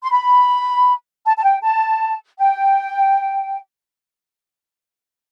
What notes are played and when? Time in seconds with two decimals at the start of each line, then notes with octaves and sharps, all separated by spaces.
0.02 C6
0.12 B5
1.25 A5
1.36 A5
1.43 G5
1.62 A5
2.38 G5